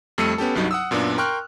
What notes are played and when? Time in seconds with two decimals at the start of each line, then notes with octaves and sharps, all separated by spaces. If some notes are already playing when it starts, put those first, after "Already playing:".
0.18 F2 G3 A3 E6 C#7 D#7
0.38 B3 C#4 G4 A4
0.55 C2 G2 F#3 D#4
0.71 F#5 D#6 E6
0.91 F#2 A#2 A#3 B3 D4
1.18 A#4 G5 C6 C#6 F6 F#6